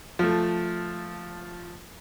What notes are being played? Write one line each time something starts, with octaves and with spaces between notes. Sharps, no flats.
F3 A3